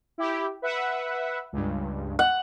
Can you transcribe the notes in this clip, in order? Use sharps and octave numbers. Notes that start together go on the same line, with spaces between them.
E4 G4
B4 E5 F#5
C#2 G2
F#5